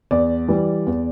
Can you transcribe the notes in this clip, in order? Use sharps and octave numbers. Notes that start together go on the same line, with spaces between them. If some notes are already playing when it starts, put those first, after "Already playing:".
E2 D5
E3 G3
E2